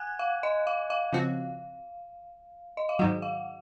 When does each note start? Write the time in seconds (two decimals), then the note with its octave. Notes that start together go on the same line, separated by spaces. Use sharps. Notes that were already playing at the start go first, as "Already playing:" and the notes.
Already playing: F#5 G#5 F#6 G#6
0.19 F5
0.43 D#5
0.67 F5
0.90 F5
1.13 C#3 F3 C4 F#4
2.77 D#5
2.89 F5
2.99 G#2 D#3 F#3 F#4 F#5
3.22 F5